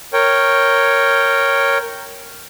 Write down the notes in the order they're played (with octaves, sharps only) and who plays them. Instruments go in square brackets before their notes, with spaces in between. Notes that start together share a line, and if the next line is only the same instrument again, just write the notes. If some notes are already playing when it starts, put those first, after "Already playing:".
[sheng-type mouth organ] A#4 C#5 G5